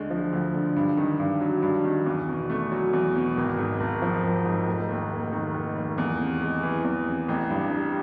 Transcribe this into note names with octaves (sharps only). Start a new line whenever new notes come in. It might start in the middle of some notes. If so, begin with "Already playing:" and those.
Already playing: D2 D3 G#3
F3
D2
D3
G2
D#3
G2
F#3
G2
D#3
E2
B2
A3
F#3
E2
B2
G#1
G#2
G#1
F3
G#1
G#2
F1
D#2
F1
D#3
F1
D#2
E2
C3
G#3
E3
E2
C3
A1
G2
G3